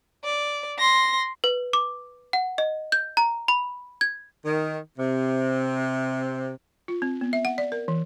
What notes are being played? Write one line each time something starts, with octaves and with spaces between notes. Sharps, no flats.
D5
C6 A#6
B4
D6
F#5
D#5
G6
A#5
B5
G#6
D#3
C3
F4
C4
B3
E5
F#5
D5
A#4
E3